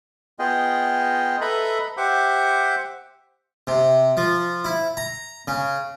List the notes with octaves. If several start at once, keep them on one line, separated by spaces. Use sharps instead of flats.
B3 F4 G#4 D#5 G5
A4 B4 D#5 E5 A#5 B5
G4 C5 E5 F#5 D6
C3
F3
E4
A#5
C#3